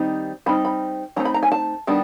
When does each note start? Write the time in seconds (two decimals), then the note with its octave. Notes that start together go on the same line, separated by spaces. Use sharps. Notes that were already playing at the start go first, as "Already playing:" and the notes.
Already playing: D#3 G3 C4 D#4
0.46 G3 C4 D#4 B5
0.65 B5
1.16 E3 A3 C4 D#4 A#5
1.25 B5
1.34 A#5
1.43 G#5
1.52 A5
1.87 D#3 G3 B3 D4